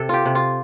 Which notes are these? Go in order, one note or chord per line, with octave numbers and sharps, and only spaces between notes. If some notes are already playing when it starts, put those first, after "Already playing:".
Already playing: C3 A4
F4 G4
C3
F4